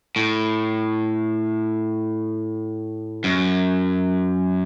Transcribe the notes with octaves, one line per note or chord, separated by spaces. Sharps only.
A2
F#2